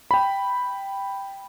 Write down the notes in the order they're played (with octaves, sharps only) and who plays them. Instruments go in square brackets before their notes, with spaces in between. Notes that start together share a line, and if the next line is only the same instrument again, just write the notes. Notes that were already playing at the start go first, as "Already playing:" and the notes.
[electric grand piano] G5 B5